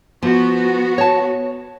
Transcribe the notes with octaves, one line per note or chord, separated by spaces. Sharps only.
F3 B3 F#4
C#5 A5